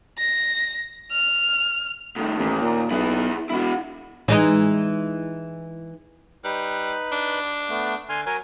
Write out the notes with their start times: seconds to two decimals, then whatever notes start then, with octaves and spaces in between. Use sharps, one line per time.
0.18 A#6
1.11 F6
2.16 A2 D#3
2.39 A1 D#2
2.62 A#2
2.91 B1 E4 G#4
3.50 E1 E4 F#4
4.28 E3 G#3 D#4
6.44 G3 D#4 B4 F#6
7.12 D4
7.70 A3 B3
8.09 D3 G#5 C6 F6
8.26 F#3 A#4 C#5 G#5